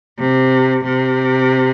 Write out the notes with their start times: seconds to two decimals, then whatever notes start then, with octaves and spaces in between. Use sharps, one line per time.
0.20 C3
0.84 C3